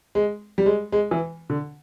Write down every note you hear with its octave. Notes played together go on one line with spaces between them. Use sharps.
G#3
G3
G#3
G#3
E3
D3